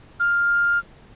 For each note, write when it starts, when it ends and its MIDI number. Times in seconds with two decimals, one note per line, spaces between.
0.20 0.78 89